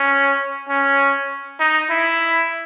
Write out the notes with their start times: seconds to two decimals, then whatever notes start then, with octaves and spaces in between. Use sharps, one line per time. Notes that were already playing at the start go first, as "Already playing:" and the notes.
Already playing: C#4
0.69 C#4
1.60 D#4
1.90 E4